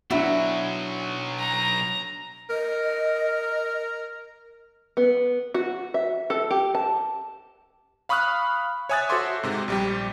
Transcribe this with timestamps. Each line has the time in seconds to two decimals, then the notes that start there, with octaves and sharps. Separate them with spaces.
0.11 B1 F#3 B3 D4 E4 F#4
1.39 A#5
2.50 A#4 D#5
4.97 B3
5.54 F#4
5.94 E5
6.30 A4
6.51 G4
6.75 A5
8.09 F5 B5 C#6 D#6 F6 F#6
8.89 C#5 E5 G#5 D#6 F#6 A6
9.09 F#4 A4 C5 E5 C6 D6
9.43 G#2 C3
9.68 A#1 G3 G4